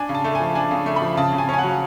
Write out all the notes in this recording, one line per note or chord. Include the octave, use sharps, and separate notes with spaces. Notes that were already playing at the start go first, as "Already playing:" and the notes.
Already playing: D4 G#5
C#3
A5
A3
F3 G#5
D4 G#5
C#3
A3
B5
F3
C#3 A5
C#3
G#5
C#4 G#5
F#5
F#3